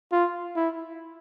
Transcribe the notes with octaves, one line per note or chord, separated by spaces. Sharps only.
F4
E4